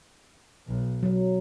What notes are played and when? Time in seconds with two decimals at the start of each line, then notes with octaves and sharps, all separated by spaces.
0.67 B1
1.03 F#3